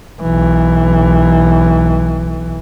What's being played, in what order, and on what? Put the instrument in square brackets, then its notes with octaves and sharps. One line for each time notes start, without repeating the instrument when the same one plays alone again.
[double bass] B1 E3